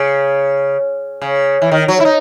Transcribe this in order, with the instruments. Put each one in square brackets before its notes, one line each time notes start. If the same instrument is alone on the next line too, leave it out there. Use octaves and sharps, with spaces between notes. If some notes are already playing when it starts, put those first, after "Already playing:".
Already playing: [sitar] C#3
C#3
E3
D#3
F#3
E4
D#4